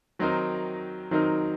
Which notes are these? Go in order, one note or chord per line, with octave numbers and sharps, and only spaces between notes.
D#3 F#3 C4 D#4 A#4
D#3 F#3 C4 D#4 A#4